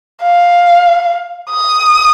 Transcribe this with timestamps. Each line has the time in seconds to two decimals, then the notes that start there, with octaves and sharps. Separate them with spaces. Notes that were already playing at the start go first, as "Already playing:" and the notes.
0.23 F5
1.51 D#6